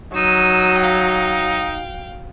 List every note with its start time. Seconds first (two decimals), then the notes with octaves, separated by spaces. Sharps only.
0.15 F#3 D#4 E6 D#7
0.80 F5 G5